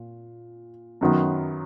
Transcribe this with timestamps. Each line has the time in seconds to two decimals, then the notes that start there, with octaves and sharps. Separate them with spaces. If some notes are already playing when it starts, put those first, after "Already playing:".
Already playing: A#2
1.01 F#2 D#3 F#3 B3